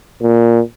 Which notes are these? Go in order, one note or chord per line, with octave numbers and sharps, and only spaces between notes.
A#2